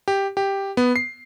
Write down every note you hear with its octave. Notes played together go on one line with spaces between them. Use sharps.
G4
G4
B3
C7